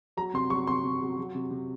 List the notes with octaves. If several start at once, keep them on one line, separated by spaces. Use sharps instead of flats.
F#3 A#5
C3 C6
F#3 C#6
C3 C6
C3
F#3
F#3
C3
C3